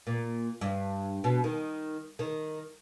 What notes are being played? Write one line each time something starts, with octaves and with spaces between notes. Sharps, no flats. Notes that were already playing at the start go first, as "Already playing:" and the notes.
A#2
G2
B2
D#3
D#3